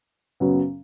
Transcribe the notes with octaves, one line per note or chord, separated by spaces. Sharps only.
F#2 C#3 F#3 B3